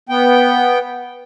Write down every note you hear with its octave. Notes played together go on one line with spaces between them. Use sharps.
B3 G5